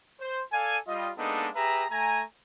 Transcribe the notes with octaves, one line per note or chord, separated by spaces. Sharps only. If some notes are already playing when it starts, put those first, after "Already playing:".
C5
A4 D5 F5 G#5
G3 F4 D#5
G#3 A#3 B3 D4 D#4 A4
G4 G#4 B4 E5 A#5
A3 G#5 A#5